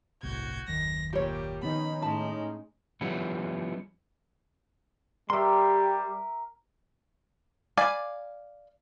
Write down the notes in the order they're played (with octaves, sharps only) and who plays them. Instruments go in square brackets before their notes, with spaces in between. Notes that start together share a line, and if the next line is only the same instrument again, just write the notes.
[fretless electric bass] G1 C2 A2 [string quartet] F#4 G6 G#6
[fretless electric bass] F#1 D#2 D#3 [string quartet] A#6
[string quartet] A#2 G3 [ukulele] G4 C#5
[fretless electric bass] D#3 F3 B3 [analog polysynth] C#4 D#4 [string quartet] B5
[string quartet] A2 G#3 [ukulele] A5
[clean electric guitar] F3 G3 B3 C#4 E4
[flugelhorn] G3 [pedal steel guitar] G4 C6 [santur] A#4 E5
[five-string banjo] D5 F5 G#5 B5